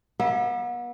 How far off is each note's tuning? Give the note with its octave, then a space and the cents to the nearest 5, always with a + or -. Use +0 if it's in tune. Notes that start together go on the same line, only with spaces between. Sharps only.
B3 -40 E5 +0